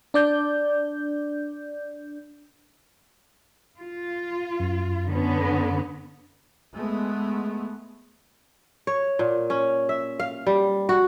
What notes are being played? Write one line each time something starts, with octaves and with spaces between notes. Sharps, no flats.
D4 D5 G6
F4
F#2
D3 B3 C#4
G#3 A3 B3
C#5
A#2
C#4
E5
F5
G3
F#4